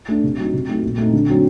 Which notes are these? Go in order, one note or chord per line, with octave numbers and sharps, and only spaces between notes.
A3 D4
C3
F#3 A3 D#4
C3
F#3 A3 D#4
A#2
A3 C4 D#4
D3
F#3 C4 D#4